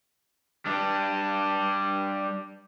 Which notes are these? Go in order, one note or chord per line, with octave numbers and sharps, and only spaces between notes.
G3 D4